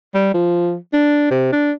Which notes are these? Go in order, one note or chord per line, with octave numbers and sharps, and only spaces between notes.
G3
F3
D4
C3
D4